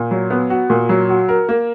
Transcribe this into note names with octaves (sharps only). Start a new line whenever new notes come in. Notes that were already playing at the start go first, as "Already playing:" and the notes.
Already playing: A#2
F#3
B3
F#4
A#2
F#3
F#4
A#4
A#3